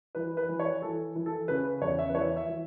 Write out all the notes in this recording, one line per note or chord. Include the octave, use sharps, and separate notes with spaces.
E3 B4
B4
E3
C#5
E3 A4
E3
A4
C#3 B4
E2 C#5
E5
B4
E3 C#5
E5
E3